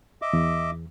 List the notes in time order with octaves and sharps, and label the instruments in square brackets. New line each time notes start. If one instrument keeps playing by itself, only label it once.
[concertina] D#5 E5 D6
[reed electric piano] E2